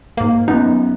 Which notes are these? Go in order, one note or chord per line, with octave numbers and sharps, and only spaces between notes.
G#2 A#3
F#2 B3 D#4